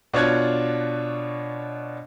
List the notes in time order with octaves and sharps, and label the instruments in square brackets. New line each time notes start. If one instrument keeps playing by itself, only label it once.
[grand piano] B2 D4 F4 C#5 F#6 G#6